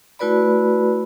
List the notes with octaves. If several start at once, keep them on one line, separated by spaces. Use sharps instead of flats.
A3 E4 F#4 B4 D5 B5